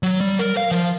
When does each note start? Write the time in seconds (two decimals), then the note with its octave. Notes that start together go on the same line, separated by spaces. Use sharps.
0.03 F#3
0.21 G3
0.39 A#4
0.57 F5
0.71 F3